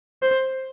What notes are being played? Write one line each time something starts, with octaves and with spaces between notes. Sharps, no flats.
C5